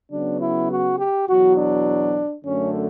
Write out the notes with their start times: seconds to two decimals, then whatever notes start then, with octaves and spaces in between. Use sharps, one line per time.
0.10 C#3 F#3 B3 D4
0.40 E4
0.70 F#4
0.98 G4
1.28 E2 B2 F#3 F#4
1.57 D4
2.44 F#2 D3 A3 C#4